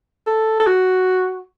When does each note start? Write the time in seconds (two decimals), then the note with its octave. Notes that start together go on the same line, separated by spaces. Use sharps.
0.26 A4
0.60 A4
0.67 F#4